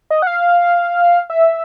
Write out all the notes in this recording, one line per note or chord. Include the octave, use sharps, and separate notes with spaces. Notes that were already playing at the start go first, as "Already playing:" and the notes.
D#5
F#5
F5
E5